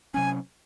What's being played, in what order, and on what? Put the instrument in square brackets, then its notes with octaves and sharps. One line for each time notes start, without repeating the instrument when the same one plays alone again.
[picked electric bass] C3 F#3 C#4 [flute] G#5